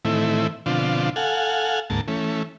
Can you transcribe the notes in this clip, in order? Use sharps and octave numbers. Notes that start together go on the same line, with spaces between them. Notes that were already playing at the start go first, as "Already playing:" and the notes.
A2 D#3 E3 A3 C4 E4
B2 D3 F3 C4 D4 F4
A4 F5 F#5 G#5
D2 G#2 A#3 A5
E3 A3 C#4